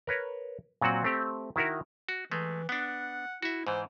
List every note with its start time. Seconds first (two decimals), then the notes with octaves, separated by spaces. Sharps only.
0.07 A#4 B4 C#5
0.81 A#2 F#3 C4 F#4 F#5
1.04 A3 C4 G4
1.56 D#3 E4 F#4 A#4
2.09 F#4
2.32 E3 G#3 A3
2.69 B3 D4 F#5
3.43 E4 F#4 E5
3.67 G#2 E3 C5